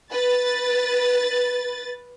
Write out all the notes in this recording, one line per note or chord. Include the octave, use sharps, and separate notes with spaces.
B4 A6